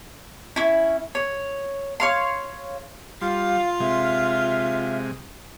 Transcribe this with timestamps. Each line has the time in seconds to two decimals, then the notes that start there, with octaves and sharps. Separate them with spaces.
0.56 C#4 E4
1.15 C#5
2.00 C#5 F5 C6
3.21 G3 F4 F5
3.80 C3 G#3 E5